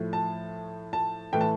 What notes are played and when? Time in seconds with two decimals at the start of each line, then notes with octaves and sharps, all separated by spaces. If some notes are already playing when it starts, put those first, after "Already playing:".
Already playing: A2 F3 A3
0.13 A5
0.93 A5
1.33 A2 E3 A3 G5
1.41 A5